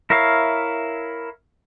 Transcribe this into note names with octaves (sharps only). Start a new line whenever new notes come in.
E4 A#4 C#5 E5 F5